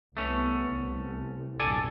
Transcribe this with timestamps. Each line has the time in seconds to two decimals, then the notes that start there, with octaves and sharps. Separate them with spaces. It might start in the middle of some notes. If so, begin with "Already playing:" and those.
0.17 C2 A3 B3 C#4
0.70 C2
1.60 A#1 E2 G2 A4 D5 G#5